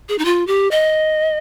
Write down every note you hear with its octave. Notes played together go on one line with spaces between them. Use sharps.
G#4
D#4
F4
G4
D#5